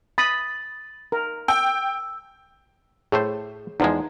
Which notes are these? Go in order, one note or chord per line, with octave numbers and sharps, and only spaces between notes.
B5 D#6 A6
A#4
G5 E6
A2 A3 G#4 C5
E2 F3 G#3 D#4 F#5 A#5